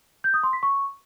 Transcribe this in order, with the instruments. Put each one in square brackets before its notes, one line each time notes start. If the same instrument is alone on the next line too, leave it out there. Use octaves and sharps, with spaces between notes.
[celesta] G6
D#6
C6
B6
C#6